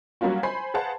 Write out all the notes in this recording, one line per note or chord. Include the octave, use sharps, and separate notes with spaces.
F#3 G3 A#3 C#4 F4 F#4
C5 G#5 B5 C7
G#4 B4 C5 F5 F#5 A5